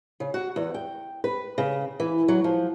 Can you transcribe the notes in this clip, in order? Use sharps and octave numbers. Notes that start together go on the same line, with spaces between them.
C#3
F#4
E2
G5
B4
C#3
E3
F#3
F3